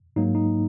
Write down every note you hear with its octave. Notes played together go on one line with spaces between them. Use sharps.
G#2 F#3 A#3 D#4
D#4